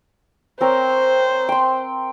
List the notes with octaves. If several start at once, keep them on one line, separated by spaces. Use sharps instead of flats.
C4 A#4 C5 C#5
G5 C6